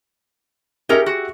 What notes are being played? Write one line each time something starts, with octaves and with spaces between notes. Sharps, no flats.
C#4 D#4 G4 G#4 A#4 E5
F#4